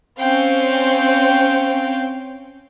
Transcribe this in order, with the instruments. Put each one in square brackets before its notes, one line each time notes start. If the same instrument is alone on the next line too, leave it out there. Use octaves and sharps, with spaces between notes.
[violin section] C4 C#4 [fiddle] F5 G5